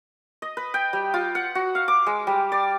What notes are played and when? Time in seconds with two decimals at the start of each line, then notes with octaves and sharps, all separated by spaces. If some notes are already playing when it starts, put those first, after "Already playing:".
0.42 D#5
0.57 B4
0.74 G5
0.93 G3
1.14 F4
1.35 F#5
1.55 F#4
1.75 F5
1.88 D6
2.06 G#3
2.27 G3
2.52 D5